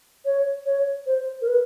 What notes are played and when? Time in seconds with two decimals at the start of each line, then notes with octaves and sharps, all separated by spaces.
0.25 C#5
0.66 C#5
1.07 C5
1.41 A#4
1.48 B4